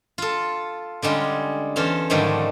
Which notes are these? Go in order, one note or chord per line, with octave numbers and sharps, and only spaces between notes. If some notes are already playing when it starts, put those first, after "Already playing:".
F4 A4
D3 G3 G#3 C#4
E2 C#4 A4 C5 F5
G#2 D3 D#3 F3 G3 A3